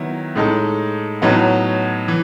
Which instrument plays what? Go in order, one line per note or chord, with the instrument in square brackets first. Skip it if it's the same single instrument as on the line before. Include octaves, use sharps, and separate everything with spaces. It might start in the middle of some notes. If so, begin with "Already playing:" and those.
Already playing: [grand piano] D#3 F#3 B3 E4
A2 G#3 D#4 A4
A2 F#3 B3 D#4
E3